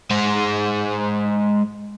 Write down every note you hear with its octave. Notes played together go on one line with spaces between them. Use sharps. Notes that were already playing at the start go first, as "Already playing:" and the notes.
G#3 C5